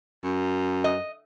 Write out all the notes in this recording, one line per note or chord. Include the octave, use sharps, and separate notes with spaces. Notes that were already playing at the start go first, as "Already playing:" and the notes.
F#2
D#5